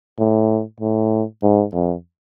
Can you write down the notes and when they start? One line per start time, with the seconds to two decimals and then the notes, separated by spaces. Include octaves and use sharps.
0.19 A2
0.80 A2
1.43 G#2
1.73 F2